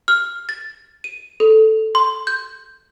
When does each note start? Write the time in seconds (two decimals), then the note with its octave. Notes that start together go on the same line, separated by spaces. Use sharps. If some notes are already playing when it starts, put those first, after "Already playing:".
0.08 F6
0.49 A6
1.04 D#7
1.40 A4
1.95 C6
2.27 G6